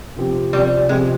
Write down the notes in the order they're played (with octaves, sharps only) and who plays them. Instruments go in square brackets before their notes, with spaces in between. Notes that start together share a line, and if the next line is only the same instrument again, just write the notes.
[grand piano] C3 F3 C4 G4
[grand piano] C3 F3 C4 G4 [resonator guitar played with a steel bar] G3
[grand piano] C3 F3 C4 G4 [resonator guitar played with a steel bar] G#3